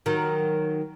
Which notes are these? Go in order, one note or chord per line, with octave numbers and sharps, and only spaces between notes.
D#3 F#3